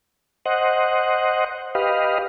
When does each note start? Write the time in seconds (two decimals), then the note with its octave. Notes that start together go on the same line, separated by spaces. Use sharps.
0.46 C5 D#5 F#5
1.75 G4 B4 D#5 F5